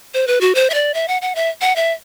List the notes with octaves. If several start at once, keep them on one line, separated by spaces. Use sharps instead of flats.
C5
B4
F#4
C5
E5
D5
E5
F#5
F#5
E5
F#5
E5